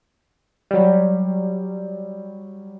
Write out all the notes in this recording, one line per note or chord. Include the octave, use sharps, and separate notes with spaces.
F#3 G3